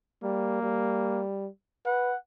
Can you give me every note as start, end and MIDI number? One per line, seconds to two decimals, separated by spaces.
0.23 0.60 55
0.23 1.24 58
0.63 1.48 55
1.86 2.14 71
1.86 2.16 78